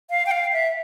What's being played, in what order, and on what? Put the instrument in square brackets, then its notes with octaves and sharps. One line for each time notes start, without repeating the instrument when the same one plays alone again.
[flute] F5
G5
F5
E5